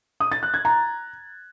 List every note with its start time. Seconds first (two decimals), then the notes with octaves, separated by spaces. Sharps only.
0.20 D#6
0.32 A6
0.43 F#6
0.54 G#6
0.65 A#5